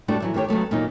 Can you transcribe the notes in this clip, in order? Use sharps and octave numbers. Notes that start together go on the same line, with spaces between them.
G3 A3 D4 E4 F#4
E3 F#3 E5
D#3 A3 G4 C#5
C#3 F#3 A3 B3
E2 A#2 D#3 F#3 D#4